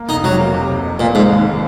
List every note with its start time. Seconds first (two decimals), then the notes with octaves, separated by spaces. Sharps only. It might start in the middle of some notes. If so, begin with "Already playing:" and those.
Already playing: A#3
0.09 F1 D#4
0.24 C3 F#3
0.39 A#3
0.54 C3
0.70 F1
0.85 F2
0.99 F1 A#2
1.15 G#2 A#3
1.30 D#2